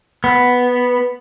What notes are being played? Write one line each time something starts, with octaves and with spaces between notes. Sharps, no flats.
B3